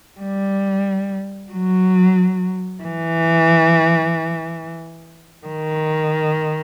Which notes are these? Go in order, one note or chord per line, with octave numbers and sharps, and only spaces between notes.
G3
F#3
E3
D#3